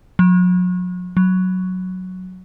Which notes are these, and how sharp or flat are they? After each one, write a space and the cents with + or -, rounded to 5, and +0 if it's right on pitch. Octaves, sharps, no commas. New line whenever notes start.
F#3 -40
F#3 +0